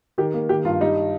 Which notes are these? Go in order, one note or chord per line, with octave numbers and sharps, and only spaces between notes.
D#3 G4
A#3
D#3 G4
G2 F4
G3 D#4